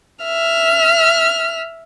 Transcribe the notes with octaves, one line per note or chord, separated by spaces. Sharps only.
E5 F6